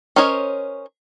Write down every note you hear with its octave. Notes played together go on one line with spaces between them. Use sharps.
C#4 A#4 C5 C#5 D#5